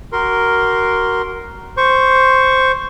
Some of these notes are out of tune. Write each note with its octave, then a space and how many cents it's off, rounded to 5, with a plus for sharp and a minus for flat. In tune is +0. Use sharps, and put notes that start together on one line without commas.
F#4 +20 A#4 +0 C6 +0
C5 +0 C#6 +0